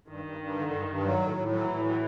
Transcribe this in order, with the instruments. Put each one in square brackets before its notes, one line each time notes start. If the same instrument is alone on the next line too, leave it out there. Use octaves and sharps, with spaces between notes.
[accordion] G2 [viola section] D#3
[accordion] G2
G2
D3
G2
G2
F#3
A2
A2
[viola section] E3 [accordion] F#3
[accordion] A2
F#3